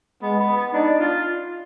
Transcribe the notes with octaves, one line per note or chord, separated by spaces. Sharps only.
G#3 B3
B3
B3
D4 D#4
F4